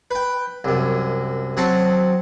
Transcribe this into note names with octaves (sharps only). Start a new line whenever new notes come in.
B4 G5
C2 F#2
F#3 C4 A5 C#6